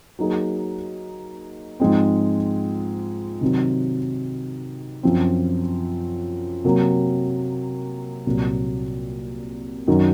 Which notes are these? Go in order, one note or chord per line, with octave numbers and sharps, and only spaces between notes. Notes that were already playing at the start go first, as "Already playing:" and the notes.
F#3 A#3 D#4 G#4
G#2 F3 G#3 C4
C3 D#3 F#3 C4
F#2 F3 C4
C3 F#3 A#3
C2 A#2 F#3
F#2 D#3 F#3